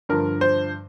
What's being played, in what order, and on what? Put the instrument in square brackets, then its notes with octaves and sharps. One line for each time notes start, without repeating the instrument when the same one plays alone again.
[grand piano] G2 D3 F3 A#4
C5